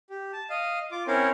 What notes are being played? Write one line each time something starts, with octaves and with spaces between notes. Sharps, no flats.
G4
A5
D#5 F5
F4 D6
C4 C#4 E4 A#4 C5 C#5